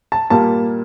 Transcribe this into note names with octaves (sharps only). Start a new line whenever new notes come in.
A5
A#2 G3 A#3 A5